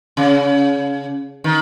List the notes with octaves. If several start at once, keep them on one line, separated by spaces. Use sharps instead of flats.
C#3
D#3